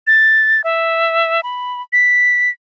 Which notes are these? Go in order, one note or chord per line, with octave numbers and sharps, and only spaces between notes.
A6
E5
B5
B6